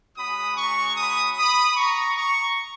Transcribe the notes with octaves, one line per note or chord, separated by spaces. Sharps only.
G#3 C#4 F#4 B5 D#6
A#5 C#6
B5 D#6
B5 D#6
A#5 C#6
A#5 C#6